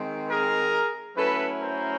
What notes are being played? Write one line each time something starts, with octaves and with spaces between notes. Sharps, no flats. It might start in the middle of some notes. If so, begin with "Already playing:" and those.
Already playing: D#3 G#3 C4
G#4 A#4
F#3 A3 C#4 E4 A4 B4
A#4 C5